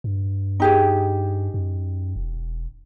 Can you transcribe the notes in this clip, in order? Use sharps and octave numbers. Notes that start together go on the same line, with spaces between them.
G2
D#4 G4 G#4
F#2
E1